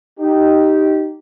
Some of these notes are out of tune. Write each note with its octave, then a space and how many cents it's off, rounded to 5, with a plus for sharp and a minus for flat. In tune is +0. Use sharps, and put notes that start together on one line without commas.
D#4 +0 G4 -15